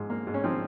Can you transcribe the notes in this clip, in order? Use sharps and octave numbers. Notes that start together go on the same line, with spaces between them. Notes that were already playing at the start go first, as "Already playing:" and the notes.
Already playing: G#2 F3
A#3
G#2
C#4
F3 C4 D#4